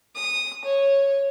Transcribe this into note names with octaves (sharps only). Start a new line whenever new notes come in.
D#6
C#5